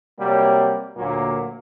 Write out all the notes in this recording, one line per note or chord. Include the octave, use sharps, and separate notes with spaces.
C3 F#3 G3 A#3
D2 A#2 F#3 A#3